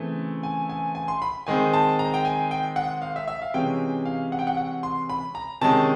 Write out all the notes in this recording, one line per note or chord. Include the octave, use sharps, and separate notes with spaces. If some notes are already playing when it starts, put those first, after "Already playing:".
Already playing: C#3 E3 A3 C4
G#5
G#5
G#5
C6
B5
D#3 G#3 C4 G#5
A5
A#5
G5
G#5
G5
F#5
F5
E5
E5
F5
C3 E3 G#3 C#4 G5
F5
F#5
G5
F#5
F#5
C6
B5
A#5
C3 D#3 G#3 C#4 A5